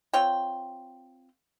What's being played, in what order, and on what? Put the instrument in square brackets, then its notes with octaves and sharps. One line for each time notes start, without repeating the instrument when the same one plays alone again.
[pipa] C4 F4 C#5 G5